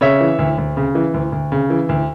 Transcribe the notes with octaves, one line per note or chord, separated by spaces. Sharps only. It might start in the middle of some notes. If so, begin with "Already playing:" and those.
C#3 C#5 E5
E3
D2
D2
C#3
E3
D2
D2
C#3
E3
D2